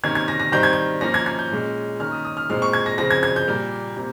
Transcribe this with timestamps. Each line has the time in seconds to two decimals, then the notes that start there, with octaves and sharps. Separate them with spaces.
0.03 C3 D#3 A#3 C#4 G#6
0.15 G#6
0.28 A#6
0.40 A#6
0.52 D#3 G3 C4 G6
0.63 G#6
0.73 G6
1.01 F3 A#3 C#4 A#6
1.14 G#6
1.26 G#6
1.39 G6
1.51 A#2 G#3 C#4
2.00 D#3 A#3 C#4 F6
2.12 D#6
2.25 D#6
2.37 F6
2.50 A#2 G#3 C4 F6
2.62 C#6
2.73 G#6
2.86 A#6
2.98 C#3 F3 C4 A#6
3.11 G#6
3.23 G#6
3.36 G6
3.48 A#2 G3 A#3
3.97 C3 A#3